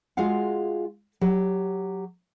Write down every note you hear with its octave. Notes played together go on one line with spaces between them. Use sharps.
G#3 F4 F#4 G#4 F5 F#5
F#3 G4